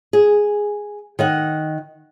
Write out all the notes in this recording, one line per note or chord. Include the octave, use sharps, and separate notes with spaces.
G#4
D#3 D#5 F#5